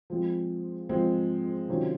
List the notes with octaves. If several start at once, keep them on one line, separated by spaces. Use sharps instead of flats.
F3 G#3 C4
F3 G#3 C4
C3 D#3 F#3 C#4 F4